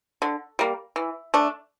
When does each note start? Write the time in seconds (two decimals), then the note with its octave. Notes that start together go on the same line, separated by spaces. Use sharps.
0.22 D3
0.59 G3 A#3
0.96 E3
1.34 A3 D4